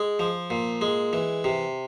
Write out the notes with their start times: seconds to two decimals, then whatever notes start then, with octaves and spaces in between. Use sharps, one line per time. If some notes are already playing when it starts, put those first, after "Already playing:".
Already playing: G#3
0.19 F3
0.50 A#2
0.81 G#3
1.13 E3
1.44 C3